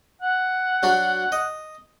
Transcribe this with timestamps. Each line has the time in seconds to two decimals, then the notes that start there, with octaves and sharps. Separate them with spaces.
0.22 F#5
0.83 F#3 D4 F#4
1.32 D#5